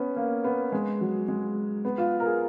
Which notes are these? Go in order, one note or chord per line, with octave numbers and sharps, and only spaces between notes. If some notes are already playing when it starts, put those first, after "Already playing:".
Already playing: B3 C#4
A#3
B3
G#3
F#3
G#3
B3
F4
A#4
G#4